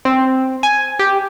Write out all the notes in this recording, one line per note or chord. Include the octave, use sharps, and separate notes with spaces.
C4
G#5
G4